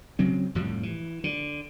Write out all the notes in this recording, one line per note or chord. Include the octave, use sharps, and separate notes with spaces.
C#3 F#3 C4
F1 A2 F3 G3
E3
D3